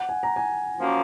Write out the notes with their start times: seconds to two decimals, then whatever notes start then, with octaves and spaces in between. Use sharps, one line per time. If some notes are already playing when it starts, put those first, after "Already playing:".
Already playing: F#5
0.09 G#5
0.23 A#5
0.36 G#5
0.78 F#2 F3 A#3